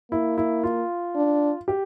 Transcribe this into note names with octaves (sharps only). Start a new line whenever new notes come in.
A#3 E4
E4
F4
D4
G4